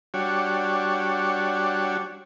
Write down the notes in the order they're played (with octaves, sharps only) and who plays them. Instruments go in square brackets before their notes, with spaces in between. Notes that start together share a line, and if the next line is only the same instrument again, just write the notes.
[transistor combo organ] G3 D4 F#4 C#5